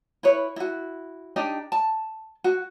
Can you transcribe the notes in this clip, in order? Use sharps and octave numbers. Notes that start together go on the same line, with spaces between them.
E4 B4 C#5
E4 F#4
D4 D#4 G4 D#5
A5
F#4